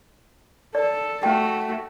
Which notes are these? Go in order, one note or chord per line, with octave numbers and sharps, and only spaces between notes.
A4 D5
A3 F#4 G5